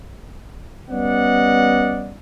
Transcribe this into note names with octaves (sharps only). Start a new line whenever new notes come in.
G3 B3 C#4 D5 D#5 F#5